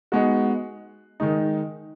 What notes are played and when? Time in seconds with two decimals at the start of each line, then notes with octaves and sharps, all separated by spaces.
0.12 G#3 B3 D#4 F#4
1.20 D#3 G#3 D#4